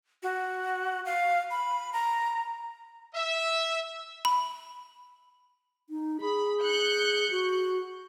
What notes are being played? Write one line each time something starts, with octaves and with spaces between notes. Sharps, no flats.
F#4
F5
B5
A#5
E5
B5
D#4
G#4 B5
F#6 G6 C#7
F#4